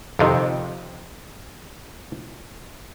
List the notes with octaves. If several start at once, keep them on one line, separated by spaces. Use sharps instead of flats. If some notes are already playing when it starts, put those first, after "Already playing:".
F2 C3 D#3